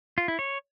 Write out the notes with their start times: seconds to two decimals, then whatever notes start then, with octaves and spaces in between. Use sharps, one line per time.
0.18 F4
0.28 E4
0.39 C#5